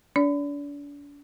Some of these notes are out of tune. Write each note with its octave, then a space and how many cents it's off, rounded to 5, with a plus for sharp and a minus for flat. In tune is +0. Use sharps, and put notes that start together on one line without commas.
D4 -40 D5 -35